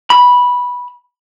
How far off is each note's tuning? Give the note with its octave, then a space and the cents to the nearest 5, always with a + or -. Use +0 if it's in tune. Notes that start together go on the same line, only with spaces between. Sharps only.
B5 -10